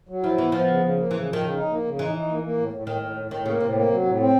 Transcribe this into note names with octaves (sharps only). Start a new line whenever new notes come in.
F#3
F3 E4
E3 B3
F3 B3
C#3
C#3
A#3
C#3 E3
F3
D#3
C#3
D#4
A#3
C#3
E3 D#4
D#4
A#3
A#3
A2
A2
A2 D#3
A2
A2
A2 D#3
C#3 A#3
A2 C3
A#3
F#3
A2
C4